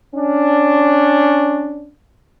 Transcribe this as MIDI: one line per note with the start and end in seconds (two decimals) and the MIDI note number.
0.15 1.92 61
0.15 1.92 62